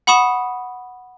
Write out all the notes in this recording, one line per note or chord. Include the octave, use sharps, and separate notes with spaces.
F#5 B5 C#6 D#6 E7